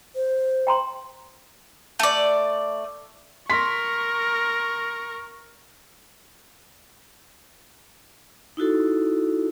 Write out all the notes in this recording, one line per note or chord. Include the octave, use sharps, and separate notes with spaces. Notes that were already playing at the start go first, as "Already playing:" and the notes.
C5
G5 A#5 C6
A3 D5
A#4 C6 C#6 B6
D#4 E4 F#4 A4